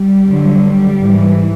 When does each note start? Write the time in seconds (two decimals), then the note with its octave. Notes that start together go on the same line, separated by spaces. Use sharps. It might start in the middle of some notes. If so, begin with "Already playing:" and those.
Already playing: G3
0.27 G2 D3 F#3
0.62 G3
0.98 G#2 E3